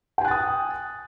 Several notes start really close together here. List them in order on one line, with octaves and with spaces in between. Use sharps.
G5 G#5 F#6 A6 D#6